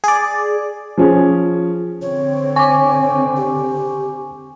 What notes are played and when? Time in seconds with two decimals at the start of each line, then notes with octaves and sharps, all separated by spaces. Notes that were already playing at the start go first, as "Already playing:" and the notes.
0.04 G#4 D5
0.98 F3 C#4 G#4
2.02 D3 C4 C#5
2.56 G#5 C#6 D6
3.37 G4